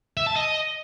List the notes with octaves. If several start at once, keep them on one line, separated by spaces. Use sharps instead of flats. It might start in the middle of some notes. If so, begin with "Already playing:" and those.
E5
A5
D#5